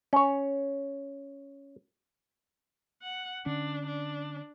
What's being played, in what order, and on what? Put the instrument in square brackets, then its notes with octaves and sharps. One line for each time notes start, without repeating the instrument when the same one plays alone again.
[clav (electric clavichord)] C#4 C#5
[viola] F#5
[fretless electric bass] D3 C#4 [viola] D4
[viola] D4